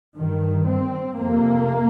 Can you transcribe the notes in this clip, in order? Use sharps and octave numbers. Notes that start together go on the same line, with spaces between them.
G2 D#3
C4
F2 C3 A#3